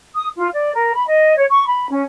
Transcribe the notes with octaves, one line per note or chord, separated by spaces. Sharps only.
D#6
F4
D5
A#4
B5
D#5
C#5
C#6
B5
C#4